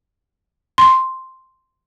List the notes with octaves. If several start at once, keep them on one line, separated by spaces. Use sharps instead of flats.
C6